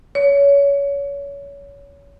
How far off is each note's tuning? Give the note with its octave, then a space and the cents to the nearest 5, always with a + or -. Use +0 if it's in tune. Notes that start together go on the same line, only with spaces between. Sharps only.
C#5 +25